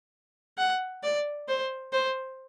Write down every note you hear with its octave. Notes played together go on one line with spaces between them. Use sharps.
F#5
D5
C5
C5